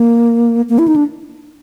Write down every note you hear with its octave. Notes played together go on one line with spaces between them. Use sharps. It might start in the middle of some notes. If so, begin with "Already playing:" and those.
Already playing: A#3
A#3
E4
D#4
D4